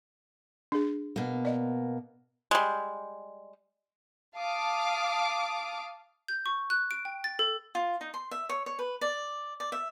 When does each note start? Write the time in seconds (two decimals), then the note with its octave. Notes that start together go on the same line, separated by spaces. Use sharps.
0.72 D4 G#4
1.16 B2 A#3
1.45 D5 D#5
2.51 G3 G#3
4.37 F5 A5 D6 D#6
6.28 G6
6.46 C#6
6.70 F#6
6.91 D7
7.05 G5
7.24 A6
7.39 A4
7.75 F4
8.01 D#4
8.14 C6
8.31 E5
8.49 C#5
8.66 C#5
8.79 B4
9.01 D5
9.60 D5
9.72 E5